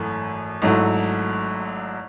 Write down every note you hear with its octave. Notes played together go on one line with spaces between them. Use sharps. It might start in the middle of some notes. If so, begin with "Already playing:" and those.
Already playing: G#1 F#2 E3 A3
G#1 G#2 F#3 A3 E4